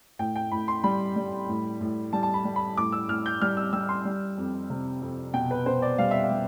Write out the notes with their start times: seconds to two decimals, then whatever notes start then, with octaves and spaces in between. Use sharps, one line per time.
0.19 A2 G5
0.36 G5
0.52 A2 B5
0.68 C6
0.84 G3 B5
1.16 G3
1.48 A2
1.81 A2
2.13 G3 A5
2.23 A5
2.34 B5
2.45 G3
2.56 B5
2.77 A2 D6
2.92 E6
3.09 A2 F6
3.26 G6
3.41 G3 F6
3.57 E6
3.73 G3 E6
3.89 C6
4.05 G3
4.38 F2
4.70 C3
5.02 F2
5.34 B2 G5
5.51 B4
5.66 B2 C5
5.82 D5
5.98 G3 F5
6.11 E5
6.23 F5
6.31 G3